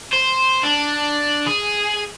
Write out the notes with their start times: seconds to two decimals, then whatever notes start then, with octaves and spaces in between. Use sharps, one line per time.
0.13 C5
0.63 D4
1.46 G#4